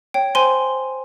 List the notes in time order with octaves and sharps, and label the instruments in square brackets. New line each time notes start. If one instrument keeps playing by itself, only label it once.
[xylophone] C#5 G5
C5 G#5 C6